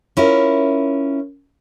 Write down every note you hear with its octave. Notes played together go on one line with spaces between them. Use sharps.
C#4 E4 F4 A#4